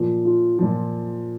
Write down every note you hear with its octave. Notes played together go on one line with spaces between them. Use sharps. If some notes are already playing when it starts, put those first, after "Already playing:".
Already playing: A#2 F3
F4
A#2 F3